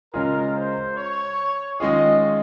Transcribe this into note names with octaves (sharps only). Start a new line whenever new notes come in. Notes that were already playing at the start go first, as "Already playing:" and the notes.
C#3 G#3 C#4 F4 G#4 A#4
C5
C#5
D#3 G#3 C#4 F4 G#4 D#5